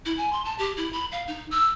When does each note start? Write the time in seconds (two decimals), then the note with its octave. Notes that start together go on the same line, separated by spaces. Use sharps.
0.06 E4
0.18 G#5
0.33 C6
0.45 A5
0.59 G4
0.77 E4
0.93 B5
1.12 F5
1.28 D#4
1.51 E6